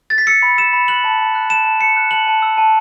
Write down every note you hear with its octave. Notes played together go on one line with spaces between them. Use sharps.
A6
B6
E6 C#7
B5
E6 E7
B5
F#6 F#7
A5
A5
F#6
A5 E7
A5
A5 C#7
F#6
A5 F#7
A5
E6
A5